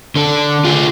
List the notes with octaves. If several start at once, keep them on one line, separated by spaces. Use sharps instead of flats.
D3 A4
F4 G#4